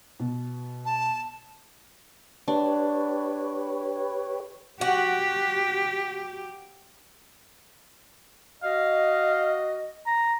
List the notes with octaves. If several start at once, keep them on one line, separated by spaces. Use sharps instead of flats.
B2
A5
D4 G4 B4 C#5
F#4 G4
F#4 D#5 F5
A#5